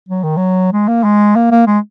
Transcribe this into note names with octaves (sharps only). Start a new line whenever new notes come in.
F#3
D#3
F#3
G#3
A#3
G#3
A#3
A#3
G#3